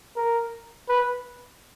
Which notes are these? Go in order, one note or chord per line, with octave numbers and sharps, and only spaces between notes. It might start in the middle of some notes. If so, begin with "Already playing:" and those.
A#4
B4